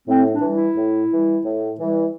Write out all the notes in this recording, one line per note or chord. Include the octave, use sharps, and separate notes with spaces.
A2 C4
D4
E3 G3
E4
A2
E3 G3
A2
E3 G3